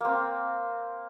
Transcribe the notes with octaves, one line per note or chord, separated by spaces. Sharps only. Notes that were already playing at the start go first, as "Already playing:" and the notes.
A#3 C4